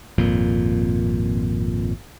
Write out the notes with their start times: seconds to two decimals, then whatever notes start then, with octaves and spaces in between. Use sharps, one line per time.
0.18 G#1 F2 A#2